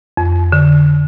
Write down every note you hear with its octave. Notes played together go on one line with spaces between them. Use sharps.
F2
D3